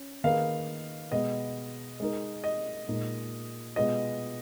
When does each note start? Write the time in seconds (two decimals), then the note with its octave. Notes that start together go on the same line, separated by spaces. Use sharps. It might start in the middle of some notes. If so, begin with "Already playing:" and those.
Already playing: C#4
0.24 D#3 A#3 D#4 G#4 B4 F5
1.11 B2 G#3 B3 D#5
2.00 G#3 D#4 A#4
2.44 D#5
2.88 A#2 G#3 D#4
3.76 B2 G#3 B3 F4 D#5